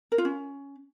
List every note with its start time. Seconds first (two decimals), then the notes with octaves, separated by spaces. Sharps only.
0.12 A#4
0.18 F4
0.25 C#4